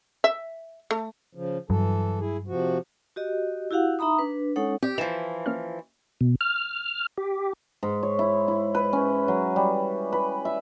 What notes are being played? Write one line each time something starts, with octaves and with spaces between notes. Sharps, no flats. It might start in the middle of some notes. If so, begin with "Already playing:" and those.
E5
A3
C#3 F3
G2 E3 F#3 A4
E4 G#4
C3 F3 F#4
F#4 G4 D#5
E4 F#4 G4 F5 F#5
D#4 E5 A#5 B5 D#6
D4 B4
G#3 C#4 D#4 A4 C#5 F#5
C4 G4 D5
E3 F3 E7
A#3 C#4 F6
B2
F6
G4
G#2
C#5
E4
E4
B4
C#4
F#3
G3
B4
E5